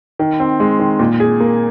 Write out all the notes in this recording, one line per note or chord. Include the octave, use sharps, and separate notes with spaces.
D#3
C4
G#3
D#3
A#2
G#4
A#3